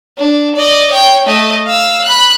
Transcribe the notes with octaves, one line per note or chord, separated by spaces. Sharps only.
D4
D5 D#5
C#5 G5
A3 D#5
F5 E6
B5 F#6